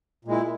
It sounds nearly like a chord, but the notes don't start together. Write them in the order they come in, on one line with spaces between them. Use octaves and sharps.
A#2 G#3 E4